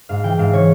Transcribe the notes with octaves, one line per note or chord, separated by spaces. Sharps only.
G#2 F5
E3 G5
G#2 F5
E3 C#5